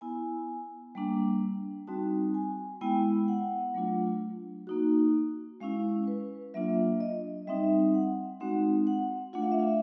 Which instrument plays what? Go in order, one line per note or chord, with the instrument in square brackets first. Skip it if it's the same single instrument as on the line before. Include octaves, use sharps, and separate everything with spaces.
[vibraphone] B3 E4 G#5
G3 A#3 D4
G3 C4 D#4 F#4 A5
G#5
G#3 B3 E4 G5
F#5
F#3 A3 D4 F4
A#3 D#4 F#4
G#3 C#4 E4 F5
B4
F#3 A#3 D4 F4 E5
D#5
G3 C4 D#4 E5
F#5
G#3 C4 D#4 F#4 F#5
F#5
A3 D4 F4 F#5
F5
E5
F5